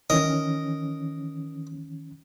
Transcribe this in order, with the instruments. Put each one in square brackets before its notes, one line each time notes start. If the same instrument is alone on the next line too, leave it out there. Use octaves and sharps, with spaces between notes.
[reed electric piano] D#3 E3 C#4 [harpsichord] A#4 D#5